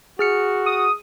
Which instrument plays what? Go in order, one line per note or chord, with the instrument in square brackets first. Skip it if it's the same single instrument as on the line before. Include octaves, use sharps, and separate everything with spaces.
[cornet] F#4 [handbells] G#4 F6 C#7
[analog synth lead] D#6